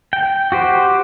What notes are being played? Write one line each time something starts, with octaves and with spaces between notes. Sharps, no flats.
G5
F#4 G4 C5